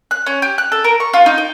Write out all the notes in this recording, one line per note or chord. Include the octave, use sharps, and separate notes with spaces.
F#6
C#4
G4
F#6
A4
A#4
C#6
F4
D#4
G5